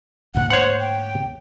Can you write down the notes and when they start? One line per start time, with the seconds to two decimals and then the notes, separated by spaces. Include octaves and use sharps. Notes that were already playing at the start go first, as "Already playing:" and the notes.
0.35 D2 G#2 A#3 F#5
0.50 C5 C#5 F#5
0.80 G5